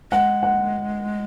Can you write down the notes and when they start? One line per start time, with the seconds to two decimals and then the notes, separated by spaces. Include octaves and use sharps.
0.11 G#3 F#5
0.43 F#5